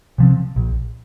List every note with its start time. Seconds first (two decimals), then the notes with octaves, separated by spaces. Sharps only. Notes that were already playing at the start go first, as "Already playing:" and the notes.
0.18 C3 F3 C4
0.56 A#1